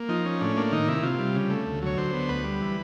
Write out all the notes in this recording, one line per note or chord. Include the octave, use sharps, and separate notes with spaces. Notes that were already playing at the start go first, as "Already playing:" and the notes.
Already playing: A#3
F3 D#4
C#4
A2 D4
A#3 D4
D#3 D#4
C3 E4
C3 F4
G3
C#3
A3
D2
F#3 C#5
D3 C5
B3
D2 B4
G3
E3